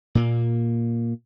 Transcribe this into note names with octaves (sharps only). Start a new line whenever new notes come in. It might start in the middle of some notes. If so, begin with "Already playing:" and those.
A#2 A#3